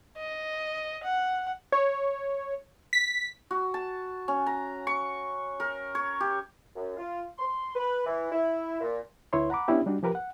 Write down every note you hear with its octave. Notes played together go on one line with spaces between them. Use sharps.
D#5
F#5
C#5
B6
F#4
A5
C#4
A#5
C#6
A#4
C#5
G4
F#2
F4
C6
B4
E3
E4
A#2
D2 E4 B4 C#5 C6
F#5 A#5 B5 D6
B3 C#4 D4 E4 G4
G3 D4 D#4 F#4
F3 G4 A#4 B4
F#5